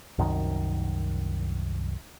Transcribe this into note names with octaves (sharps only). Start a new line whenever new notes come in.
C2 F#2 D#3